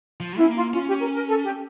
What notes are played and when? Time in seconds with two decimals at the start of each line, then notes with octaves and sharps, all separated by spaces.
0.20 F3
0.39 C#4 E4
0.48 A#3
0.56 F4
0.73 C#4 F4
0.88 G4
1.01 A#4
1.14 A#4
1.27 A4
1.44 G4